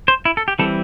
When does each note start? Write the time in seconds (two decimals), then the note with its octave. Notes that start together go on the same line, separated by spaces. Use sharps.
0.08 C5
0.25 E4
0.37 A4
0.48 G4
0.59 E3 G3 C4 A4